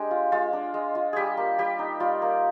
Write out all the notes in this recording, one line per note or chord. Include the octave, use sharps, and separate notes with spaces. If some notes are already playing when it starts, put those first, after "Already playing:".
Already playing: G#3 D4 G4
F4
G#3 F4
D4
G#3
F4
G3 G4 G#4
A#3
G3 G4
D#4
G3 F4
A#3